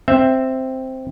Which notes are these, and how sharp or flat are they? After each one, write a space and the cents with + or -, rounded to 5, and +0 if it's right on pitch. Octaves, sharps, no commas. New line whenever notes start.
C4 +0 E5 +0